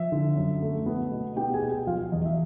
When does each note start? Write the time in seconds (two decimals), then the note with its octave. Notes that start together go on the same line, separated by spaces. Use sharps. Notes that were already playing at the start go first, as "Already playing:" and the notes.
Already playing: F3 E5
0.12 D3
0.36 F#2
0.62 A3
0.86 B3
1.11 B2
1.36 B3 G4 G5
1.54 G#4 G#5
1.62 B2
1.70 G4 G5
1.87 F3 F4 F5
2.12 E2 D#5
2.25 E5